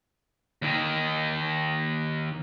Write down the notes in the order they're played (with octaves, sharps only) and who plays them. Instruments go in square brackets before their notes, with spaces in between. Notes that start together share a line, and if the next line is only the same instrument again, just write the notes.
[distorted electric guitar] D#2 D#3